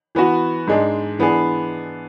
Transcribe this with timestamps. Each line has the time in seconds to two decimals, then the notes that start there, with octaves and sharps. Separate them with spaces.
0.15 E3 B3 F#4
0.67 G#2 G#3 D4
1.19 E3 B3 D4 G#4